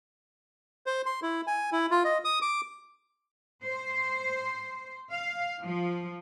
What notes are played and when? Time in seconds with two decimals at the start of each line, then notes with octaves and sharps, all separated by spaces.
0.86 C5
1.06 C6
1.22 E4
1.47 G#5
1.72 E4
1.91 F4
2.05 D#5
2.25 D#6
2.42 D6
3.65 C5
5.12 F5
5.62 F3